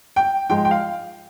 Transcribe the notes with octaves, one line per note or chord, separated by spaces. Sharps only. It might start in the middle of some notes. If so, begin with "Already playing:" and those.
G5
G#2 F3 G#3 G5
G5
F5